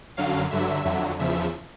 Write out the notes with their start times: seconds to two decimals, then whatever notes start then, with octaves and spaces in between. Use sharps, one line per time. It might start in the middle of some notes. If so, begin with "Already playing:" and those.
0.17 F#2 D3 F#3 F5
0.51 G2 D3 F#3 E5
0.85 F2 D3 F#3
1.19 E2 C#3 F3 E5